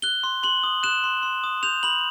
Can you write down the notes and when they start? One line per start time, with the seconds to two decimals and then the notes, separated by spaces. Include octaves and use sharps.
0.02 F#6 G7
0.23 C6
0.43 C6 F#7
0.63 D#6
0.83 F#6 E7
1.04 C6
1.23 C6
1.44 D#6
1.63 G6 F7
1.83 B5 F#7